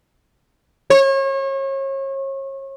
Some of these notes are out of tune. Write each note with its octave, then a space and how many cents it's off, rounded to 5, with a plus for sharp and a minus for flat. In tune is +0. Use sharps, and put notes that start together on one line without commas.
C#5 -35